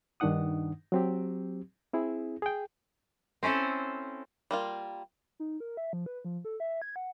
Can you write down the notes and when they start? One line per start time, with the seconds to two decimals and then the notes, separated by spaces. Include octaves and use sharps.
0.20 G2 D#3 D4 D#4 F#5 D#6
0.92 F#3 C4 G4
1.93 C4 E4 G#4
2.42 G#4 G5
3.43 C4 C#4 E4 A4 C5
4.51 G3 A#3 F4
5.40 D#4
5.60 A#4
5.77 E5
5.93 F3
6.06 B4
6.25 F3
6.45 A4
6.60 E5
6.82 G#6
6.96 F#5